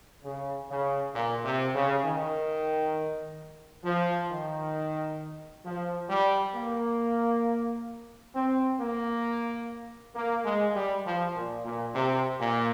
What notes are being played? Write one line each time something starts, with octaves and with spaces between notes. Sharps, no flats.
C#3
C#3
A#2
C3
C#3
D#3
F3
D#3
F3
G3
A#3
C4
A#3
A#3
G#3
G3
F3
A#2
A#2
C3
A#2